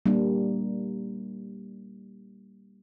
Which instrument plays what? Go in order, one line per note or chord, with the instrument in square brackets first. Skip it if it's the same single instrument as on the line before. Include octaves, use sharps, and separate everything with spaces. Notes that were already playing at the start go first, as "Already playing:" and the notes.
[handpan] G3 A#3 D4